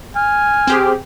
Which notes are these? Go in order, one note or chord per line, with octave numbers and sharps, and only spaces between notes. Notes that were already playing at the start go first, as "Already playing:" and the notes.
G#5 F6
C4 G4 G#4